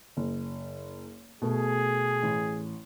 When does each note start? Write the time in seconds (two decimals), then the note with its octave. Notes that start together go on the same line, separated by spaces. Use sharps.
0.17 F#1
1.42 B2 A3 G#4
2.23 A1